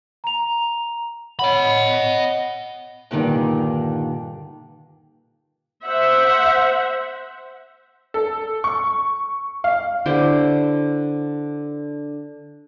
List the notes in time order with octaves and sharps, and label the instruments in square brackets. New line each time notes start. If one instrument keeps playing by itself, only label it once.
[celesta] A#5 F7
[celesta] C#5 F#5 [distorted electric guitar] D#5 B5
[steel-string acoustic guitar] G2 A#2 D3 D#3 D4
[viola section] C5 E5 F#5
[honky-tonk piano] A4
C#6
F5
[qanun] D3 E4 G4 C5